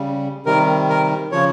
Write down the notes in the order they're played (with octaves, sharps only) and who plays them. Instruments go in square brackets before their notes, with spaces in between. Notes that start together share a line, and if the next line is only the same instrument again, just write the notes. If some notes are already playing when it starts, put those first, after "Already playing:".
Already playing: [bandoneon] C#3 G3
C3 D#3 G3 A#4
A#4
C#3 F3 C#5